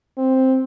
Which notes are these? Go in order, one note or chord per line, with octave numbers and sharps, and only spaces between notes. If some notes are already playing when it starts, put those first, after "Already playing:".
C4